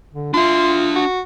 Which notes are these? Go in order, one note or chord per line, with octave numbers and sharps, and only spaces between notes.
D3
D4 F4 E5 C6
F#4